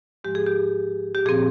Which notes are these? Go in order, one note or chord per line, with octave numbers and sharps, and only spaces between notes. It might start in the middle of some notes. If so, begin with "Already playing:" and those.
G#2 F3 G#3 G4
G#4
G4
G4
A#2 F3 C4 G#4